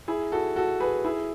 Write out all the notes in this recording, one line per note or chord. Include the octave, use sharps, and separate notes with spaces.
E4 G#4
F#4 A4
F#4 A4
G#4 B4
E4 G#4